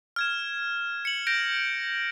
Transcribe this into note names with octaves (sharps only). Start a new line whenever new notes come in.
F6 G#6 E7
C#7 F#7
G6 A#6 D7 F7